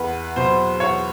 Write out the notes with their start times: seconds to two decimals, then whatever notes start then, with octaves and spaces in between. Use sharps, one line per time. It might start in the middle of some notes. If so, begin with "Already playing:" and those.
Already playing: E2 B4
0.36 B2 F#3 C5
0.80 E2 C#5